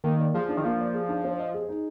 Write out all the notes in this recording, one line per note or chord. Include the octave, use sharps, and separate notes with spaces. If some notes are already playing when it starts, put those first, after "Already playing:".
D#3 A#3
D5
F3 G#4
D4
D#3
F3 A#3
D5
G#4
D4
C4
D#5
G#4
D#4